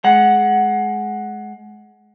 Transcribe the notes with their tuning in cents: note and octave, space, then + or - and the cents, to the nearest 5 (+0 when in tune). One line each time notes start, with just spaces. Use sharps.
G#3 +25 F#5 +0